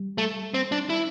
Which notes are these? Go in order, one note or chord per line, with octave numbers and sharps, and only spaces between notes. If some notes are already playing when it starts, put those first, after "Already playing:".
Already playing: G3
A3
C4
D4
E4